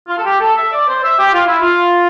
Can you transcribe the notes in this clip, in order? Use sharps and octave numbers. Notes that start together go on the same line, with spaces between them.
F4
A4
G4
A4
E5
D5
C5
E5
G4
F4
E4
F4